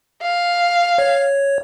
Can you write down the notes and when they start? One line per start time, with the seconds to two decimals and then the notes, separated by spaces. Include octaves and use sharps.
0.22 F5
0.98 C#5